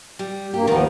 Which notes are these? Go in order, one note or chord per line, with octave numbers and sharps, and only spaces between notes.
G3
G2 A#3 G4
D#2 D#3 F3 G3 B3